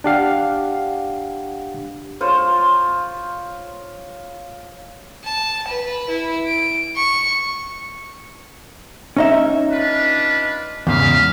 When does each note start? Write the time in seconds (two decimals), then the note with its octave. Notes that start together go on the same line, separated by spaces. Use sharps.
0.04 D4 G4 F5 F#5
2.21 F4 C5 C#5
5.25 A5
5.68 B4
6.09 E4
6.47 D7
6.96 C#6
9.17 C#4 D#4 E5
9.72 D4 F4 B4
10.87 E2 G#2 C#3 E5 F5